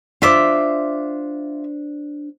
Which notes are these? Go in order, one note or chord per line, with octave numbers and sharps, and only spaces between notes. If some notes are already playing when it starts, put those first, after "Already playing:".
D4 F4 C5 E5 D6